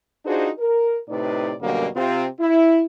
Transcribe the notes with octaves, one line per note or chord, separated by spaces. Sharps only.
D4 D#4 F4 F#4 G#4 C5
A#4
A2 C3 D#4 B4 D5
F#2 B2 D3 G3 A#3
C3 C4 F4
E4